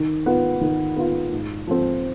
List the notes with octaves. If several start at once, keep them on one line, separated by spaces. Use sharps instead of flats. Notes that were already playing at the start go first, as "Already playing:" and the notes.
Already playing: D#3
B3 F4
D#3
B3 F4
G#2
F3 C4